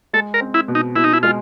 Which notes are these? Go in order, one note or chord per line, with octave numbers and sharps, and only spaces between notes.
G#3 A4
A#4
C4
E4
B2
D#4
B2 E4
D#4
E4
G#3 F4